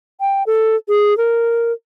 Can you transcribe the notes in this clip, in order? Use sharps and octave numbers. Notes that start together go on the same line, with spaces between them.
G5
A4
G#4
A#4